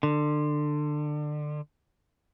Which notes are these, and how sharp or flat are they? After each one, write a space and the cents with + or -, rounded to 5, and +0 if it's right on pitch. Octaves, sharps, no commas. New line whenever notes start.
D3 +25